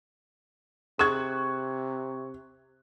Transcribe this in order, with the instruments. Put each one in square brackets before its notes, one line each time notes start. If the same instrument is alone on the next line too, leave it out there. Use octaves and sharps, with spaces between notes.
[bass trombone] C3 [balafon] G#4 [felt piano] C#6 F#6 G#6